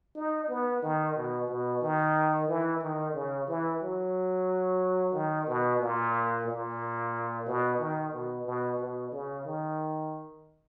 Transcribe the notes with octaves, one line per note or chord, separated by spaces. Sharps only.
D#4
B3
D#3
B2
B2
D#3
E3
D#3
C#3
E3
F#3
D#3
B2
A#2
A#2
B2
D#3
B2
B2
B2
C#3
D#3